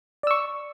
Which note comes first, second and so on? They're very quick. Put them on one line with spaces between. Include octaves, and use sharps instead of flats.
D5 E6 C#6